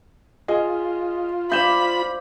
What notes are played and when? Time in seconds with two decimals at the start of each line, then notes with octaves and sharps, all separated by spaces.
0.48 F4 G#4 D#5
1.52 C5 D5 F5 B5 G6 E7